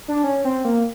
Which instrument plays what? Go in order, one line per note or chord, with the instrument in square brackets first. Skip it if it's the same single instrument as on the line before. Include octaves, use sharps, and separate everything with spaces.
[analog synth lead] D4
C#4
C4
A#3